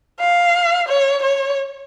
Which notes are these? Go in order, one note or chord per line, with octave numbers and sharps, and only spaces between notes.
F5
C#5
C#5